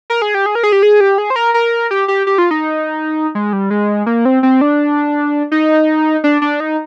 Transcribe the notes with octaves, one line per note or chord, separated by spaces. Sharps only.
A#4
G#4
G4
G#4
A#4
G#4
G4
G#4
G4
G#4
C5
A#4
A#4
G4
G4
G4
F4
D#4
G#3
G3
G#3
A#3
C4
C4
D4
D#4
D4
D4
D#4